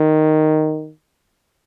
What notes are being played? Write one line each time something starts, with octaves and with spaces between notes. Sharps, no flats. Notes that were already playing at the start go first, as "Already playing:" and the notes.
Already playing: D#3